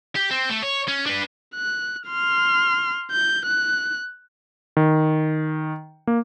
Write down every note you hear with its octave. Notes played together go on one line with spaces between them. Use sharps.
G4
C4
A3
C#5
C#4
D4 B4
F#6
C6 F6
G6
F#6
D#3
A#3